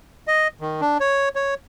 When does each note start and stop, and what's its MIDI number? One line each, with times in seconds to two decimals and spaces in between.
0.27 0.48 75
0.61 0.81 51
0.81 0.98 62
1.00 1.29 73
1.35 1.54 73